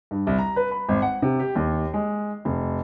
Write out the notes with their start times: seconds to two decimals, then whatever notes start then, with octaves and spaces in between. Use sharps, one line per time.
0.11 G2
0.27 C2
0.38 A#5
0.56 B4
0.71 B5
0.89 G#1
1.02 F#5
1.22 C3
1.40 G4
1.56 D#2
1.94 G#3
2.45 F1